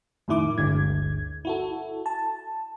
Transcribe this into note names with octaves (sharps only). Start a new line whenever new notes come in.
F2 A2 D#3 E4 D6
G1 D2 D3 G#3 G#6
E4 F#4 A4
A5